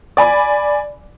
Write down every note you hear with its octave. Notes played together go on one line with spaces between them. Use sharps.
D5 G#5 B5